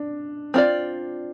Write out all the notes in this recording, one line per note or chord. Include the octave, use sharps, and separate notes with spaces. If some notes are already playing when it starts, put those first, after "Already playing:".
Already playing: D4
C4 F4 D5